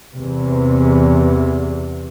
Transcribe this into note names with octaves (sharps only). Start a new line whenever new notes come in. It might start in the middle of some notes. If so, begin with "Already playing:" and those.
E2 C3